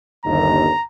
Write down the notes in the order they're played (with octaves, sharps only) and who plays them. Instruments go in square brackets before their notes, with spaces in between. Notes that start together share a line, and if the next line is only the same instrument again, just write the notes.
[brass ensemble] G1 D#2 [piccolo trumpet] A#5